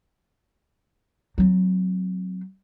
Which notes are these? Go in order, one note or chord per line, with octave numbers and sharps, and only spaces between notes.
F#3 C4